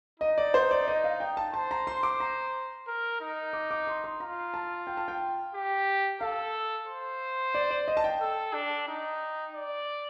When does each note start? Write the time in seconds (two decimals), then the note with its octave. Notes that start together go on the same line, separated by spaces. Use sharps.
0.20 D#4 D#5
0.38 D5
0.54 C5
0.71 D5
0.88 D#5
1.04 F5
1.20 G5
1.37 A5
1.54 C5 A5
1.71 A#5
1.87 C6
2.03 D6
2.20 A#5
2.87 A#4
3.21 D#4
3.53 D6
3.71 D6
3.87 C6
4.04 C6
4.20 F4 A#5
4.54 A5
4.87 G5
4.97 A5
5.08 G5
5.55 G4
6.21 A4 F5
6.87 C5
7.54 D5
7.71 D5
7.88 D#5
7.97 A5
8.04 G5
8.20 A4
8.54 D4
8.88 D#4
9.54 D5